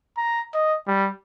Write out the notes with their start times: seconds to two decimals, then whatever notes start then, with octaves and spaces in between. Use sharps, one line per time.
0.17 A#5
0.54 D#5
0.88 G3